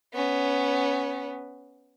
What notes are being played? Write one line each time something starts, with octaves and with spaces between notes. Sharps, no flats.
B3 C#4